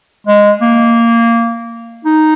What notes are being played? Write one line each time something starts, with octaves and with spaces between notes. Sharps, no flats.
G#3
A#3
D#4